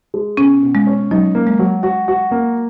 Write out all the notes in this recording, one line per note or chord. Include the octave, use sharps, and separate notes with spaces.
G#3
B2 C#4
B2
G#3
C#4
F#3 D#4
A#3
G#3
F#3
F#4
F#4
A#3